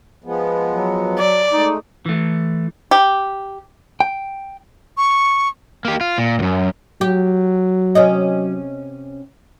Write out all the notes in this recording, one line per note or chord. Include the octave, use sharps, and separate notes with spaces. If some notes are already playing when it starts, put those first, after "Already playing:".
F3 G#3 B3
F#3
D5
G#3 A3 D#4
E3 A3
G4
G5
C#6
A#3 G4
F4
A#2
C#2 F#2
F#3 G4
C3 C#4 D#5